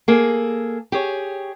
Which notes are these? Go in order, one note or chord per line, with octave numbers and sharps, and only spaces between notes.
A#3 G#4 A4
G4 G#4 C#5